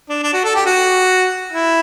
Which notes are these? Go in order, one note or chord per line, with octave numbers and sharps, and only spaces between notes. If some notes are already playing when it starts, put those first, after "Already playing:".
D4
D4
F#4
A4
G4
F#4
E4